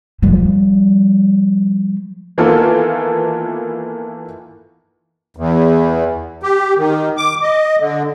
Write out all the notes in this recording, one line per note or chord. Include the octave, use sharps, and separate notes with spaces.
F3 G3
D#3 E3 A#3 B3 F4 A4
E2
G4
D#3
D6
D#5
D3